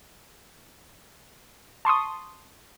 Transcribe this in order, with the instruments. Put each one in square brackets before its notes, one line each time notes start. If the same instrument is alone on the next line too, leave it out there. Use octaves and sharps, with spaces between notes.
[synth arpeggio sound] A5 C6 C#6 D#6